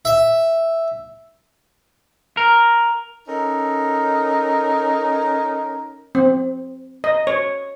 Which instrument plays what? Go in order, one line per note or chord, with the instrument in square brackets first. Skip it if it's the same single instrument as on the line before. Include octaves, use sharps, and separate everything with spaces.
[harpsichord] E5
[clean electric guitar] A#4
[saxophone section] C#4 D#4 A4 A#4
[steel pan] C4
D#5
C#5